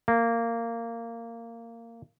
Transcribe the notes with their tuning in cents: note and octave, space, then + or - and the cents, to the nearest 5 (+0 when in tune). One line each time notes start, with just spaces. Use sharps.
A#3 -15